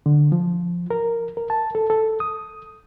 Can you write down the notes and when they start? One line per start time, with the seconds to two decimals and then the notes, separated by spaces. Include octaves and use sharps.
0.06 D3
0.32 F3
0.90 A#4
1.37 A#4
1.50 A5
1.75 A4
1.90 A4
2.20 D#6